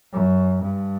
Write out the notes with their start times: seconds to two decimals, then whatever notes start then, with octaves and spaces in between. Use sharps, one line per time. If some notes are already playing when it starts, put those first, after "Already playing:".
0.13 F#2
0.62 G2